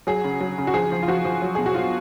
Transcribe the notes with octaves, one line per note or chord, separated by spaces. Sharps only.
F#3 G#4
C#3
F#3
C#3
F#4
F3 G#4
F3
F4
F3 F#4
F3
F#3
B2 G#4
F#4
F#3 F4